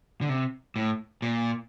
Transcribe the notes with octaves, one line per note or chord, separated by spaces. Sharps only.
D3
C3
A2
A#2